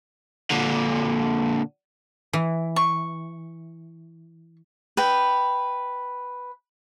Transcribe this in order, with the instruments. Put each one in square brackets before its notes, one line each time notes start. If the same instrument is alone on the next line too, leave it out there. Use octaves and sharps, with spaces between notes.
[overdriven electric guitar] A#2 D3
[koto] E3
[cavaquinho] C#6
B4 G5